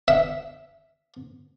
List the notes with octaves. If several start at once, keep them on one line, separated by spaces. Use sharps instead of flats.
E5